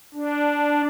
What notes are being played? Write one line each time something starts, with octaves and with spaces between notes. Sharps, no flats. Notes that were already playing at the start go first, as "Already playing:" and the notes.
D4